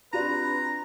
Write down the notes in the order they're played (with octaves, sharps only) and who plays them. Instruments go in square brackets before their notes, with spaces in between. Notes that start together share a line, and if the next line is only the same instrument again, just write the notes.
[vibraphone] C4 D4 [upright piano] F4 G4 D5 [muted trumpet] B4 [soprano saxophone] A#5